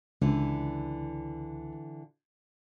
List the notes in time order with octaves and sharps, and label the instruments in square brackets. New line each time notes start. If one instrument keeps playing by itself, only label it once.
[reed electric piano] C#2 [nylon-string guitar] D3 E3